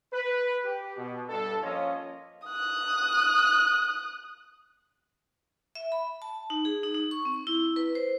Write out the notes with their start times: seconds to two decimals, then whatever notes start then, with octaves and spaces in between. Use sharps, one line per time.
0.13 B4
0.64 G4
0.97 B2
1.29 G2 A4
1.62 F3 A#3 C#4 F4 C#5 D#5
2.46 D#6 F#6
5.75 E5
5.92 B5
6.22 A5
6.50 D#4
6.65 G#4
6.83 D#4
6.94 D#4
7.11 C#6
7.25 C4
7.47 E4
7.76 B4
7.95 C5